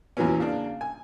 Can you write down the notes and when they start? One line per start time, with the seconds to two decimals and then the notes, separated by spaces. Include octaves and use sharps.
0.17 E2 A#2 E3 F#3 B3 C#4
0.40 C#3 A#3 D4
0.81 G#5